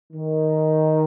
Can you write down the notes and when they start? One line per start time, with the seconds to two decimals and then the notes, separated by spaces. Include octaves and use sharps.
0.13 D#3